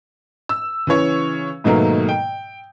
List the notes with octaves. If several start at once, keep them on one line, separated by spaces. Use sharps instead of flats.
E6
C#3 E3 C#5
G#2 B2 D#3 F#3 A3 A#3
G5